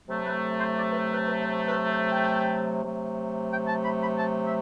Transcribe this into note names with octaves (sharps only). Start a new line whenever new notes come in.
C3 F#3 A3
B4
C5
D5
B4
B4
B4
C5
B4
C5
G5
C3 F#3 A3
G5
A5
B5
B5
A5
E5